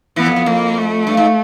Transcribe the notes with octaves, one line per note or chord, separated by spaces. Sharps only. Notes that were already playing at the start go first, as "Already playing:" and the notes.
E3 B3
F2
F2
F2 A#3
A3
G2
G#2